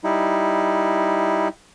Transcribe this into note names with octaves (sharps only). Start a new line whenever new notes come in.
G3 D#4 E4